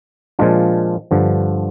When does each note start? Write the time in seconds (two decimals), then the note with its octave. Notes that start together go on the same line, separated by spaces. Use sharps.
0.39 A#2 F3 G#3 D4 F4
1.11 G2 D3 F3